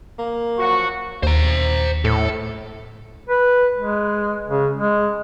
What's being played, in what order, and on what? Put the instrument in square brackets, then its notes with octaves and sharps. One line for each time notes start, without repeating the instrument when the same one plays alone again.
[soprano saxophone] A#3
[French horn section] F3 F#3 F#4 [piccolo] C#6
[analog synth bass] D#2 [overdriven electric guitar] C5 A#5
[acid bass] A2 [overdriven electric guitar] A4
[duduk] B4
G#3
C#3
G#3